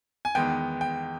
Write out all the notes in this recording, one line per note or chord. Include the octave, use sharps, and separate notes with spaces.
G#5
E2 D#3 G#3 B3 G5
G5